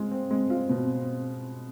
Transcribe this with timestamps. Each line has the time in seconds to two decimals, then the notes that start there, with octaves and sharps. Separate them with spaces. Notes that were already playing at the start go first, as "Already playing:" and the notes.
Already playing: G#3 F4
0.11 C4
0.31 G#3
0.50 F4
0.69 B2